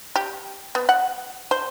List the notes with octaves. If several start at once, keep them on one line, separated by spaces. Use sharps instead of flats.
G4
B3
F#5
C5